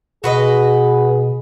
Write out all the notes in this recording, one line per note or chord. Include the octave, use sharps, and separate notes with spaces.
B2 F#4 G#4 B4 D#5